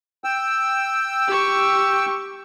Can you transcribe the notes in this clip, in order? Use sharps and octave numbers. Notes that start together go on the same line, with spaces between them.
G5 E6
G4 C#6